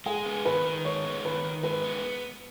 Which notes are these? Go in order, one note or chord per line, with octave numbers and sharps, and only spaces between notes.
G#3 G#4
B3
D#3 B4
D#3
G#3 C#5
B3
D#3 B4
D#3
G#3 B4
B3